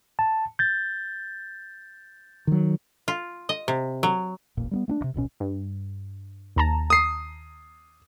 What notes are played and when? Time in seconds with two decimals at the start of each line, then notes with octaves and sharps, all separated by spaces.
0.19 A5
0.59 G6 A6
2.47 D#3 F#3
3.08 F4
3.49 D#5
3.68 C3
4.03 F#3
4.57 E1 A1 A#2
4.71 G3 A#3 B3
4.88 A3 B3 D4
5.01 D2 C3
5.14 D1 A1 B2 C#4
5.40 G2
6.56 D#2 A5 A#5
6.90 D#6 C7